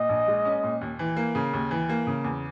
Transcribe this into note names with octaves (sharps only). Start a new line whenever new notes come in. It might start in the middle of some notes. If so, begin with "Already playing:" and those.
Already playing: A#2 D#5
A#1
G#3
C#4
A#2
D#2
E3
A#3
C#3
D#2
E3
A#3
C#3
E2